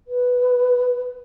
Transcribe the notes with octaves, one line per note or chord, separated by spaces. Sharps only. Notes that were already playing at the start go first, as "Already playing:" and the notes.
B4